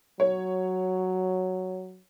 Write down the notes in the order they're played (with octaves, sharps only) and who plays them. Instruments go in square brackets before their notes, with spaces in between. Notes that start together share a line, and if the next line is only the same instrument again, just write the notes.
[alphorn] F#3 [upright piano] C#5